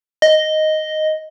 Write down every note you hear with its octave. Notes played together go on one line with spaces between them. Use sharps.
D#5